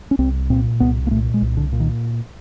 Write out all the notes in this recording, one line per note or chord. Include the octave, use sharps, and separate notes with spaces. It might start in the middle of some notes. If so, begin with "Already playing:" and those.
C#4
C2 C4
A#2 C4
C2 B3
A#3
A#2 A3
G#3
C2
D3
A#2
D#3